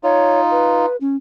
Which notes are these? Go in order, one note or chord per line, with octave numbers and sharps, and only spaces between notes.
D#4 F4 C#5
B4
C#4